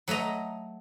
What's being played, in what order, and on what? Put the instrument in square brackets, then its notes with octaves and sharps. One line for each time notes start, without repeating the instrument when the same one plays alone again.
[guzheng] F#3 A3 D#5 A#5